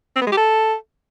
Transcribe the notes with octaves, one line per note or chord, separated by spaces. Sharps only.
C4
B3
G#3
G4
A4